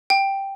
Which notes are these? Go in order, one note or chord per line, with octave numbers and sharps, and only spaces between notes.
G5